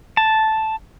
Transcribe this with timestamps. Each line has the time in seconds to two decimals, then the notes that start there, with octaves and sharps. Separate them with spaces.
0.17 A5